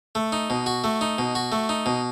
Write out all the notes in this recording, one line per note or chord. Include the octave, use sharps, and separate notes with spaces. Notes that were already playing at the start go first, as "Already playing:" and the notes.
A3
D#4
B2
F#4
A3
D#4
B2
F#4
A3
D#4
B2